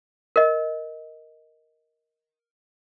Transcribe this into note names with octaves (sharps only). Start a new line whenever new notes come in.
A#4 D#5